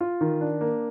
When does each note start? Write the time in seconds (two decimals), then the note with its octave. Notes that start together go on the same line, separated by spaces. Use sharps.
0.01 F4
0.21 D#3
0.41 D4
0.61 A#3